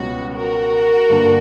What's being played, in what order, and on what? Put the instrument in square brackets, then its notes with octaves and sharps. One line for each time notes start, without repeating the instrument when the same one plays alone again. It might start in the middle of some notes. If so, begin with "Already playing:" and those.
Already playing: [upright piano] C#2 B2 G3 C#4 [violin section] F#4
[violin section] F#4 A#4
[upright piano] G2 D3 A#3 D4